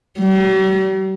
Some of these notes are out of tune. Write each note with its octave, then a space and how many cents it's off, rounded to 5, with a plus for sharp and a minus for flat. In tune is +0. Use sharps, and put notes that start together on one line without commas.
G3 -45